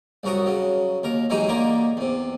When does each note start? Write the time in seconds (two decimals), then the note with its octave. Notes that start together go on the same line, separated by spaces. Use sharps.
0.23 C2 F#2 F#4 A#4 D#6
0.46 C#3 F#3
1.03 D#2 A#4
1.30 E3 F#3 G#3 D#4 G4 G#4
1.48 D3 D#3 A#3 A#4 A#5
1.97 E2 C3